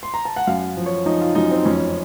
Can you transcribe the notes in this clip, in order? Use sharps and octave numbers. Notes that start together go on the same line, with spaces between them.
C6
A#5
A5
F#5
F#2 F5
F3
C#5
F3 D#4
F4
F#2 D#4
C4
F2 C#4